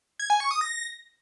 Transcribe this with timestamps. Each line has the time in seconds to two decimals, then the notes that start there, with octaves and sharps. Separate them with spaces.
0.19 G#6
0.30 G#5
0.40 C#6
0.51 D#6
0.61 A#6